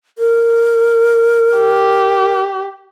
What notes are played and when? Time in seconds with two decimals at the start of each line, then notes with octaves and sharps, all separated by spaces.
0.18 A#4
1.58 G4